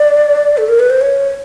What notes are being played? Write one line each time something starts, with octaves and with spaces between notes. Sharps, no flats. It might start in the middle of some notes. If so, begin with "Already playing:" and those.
Already playing: D5
A4
A#4
B4
C5
C#5